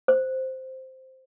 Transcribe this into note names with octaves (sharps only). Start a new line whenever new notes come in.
C5